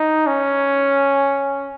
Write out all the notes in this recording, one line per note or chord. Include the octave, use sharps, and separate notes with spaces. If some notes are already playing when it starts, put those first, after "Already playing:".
Already playing: D#4
C#4